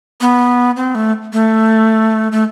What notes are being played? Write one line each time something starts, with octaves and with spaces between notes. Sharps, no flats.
B3
C4
A3
A3
A3